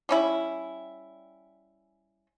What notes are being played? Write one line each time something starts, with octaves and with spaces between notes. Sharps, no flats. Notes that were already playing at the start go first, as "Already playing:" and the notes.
G3 C#4 E4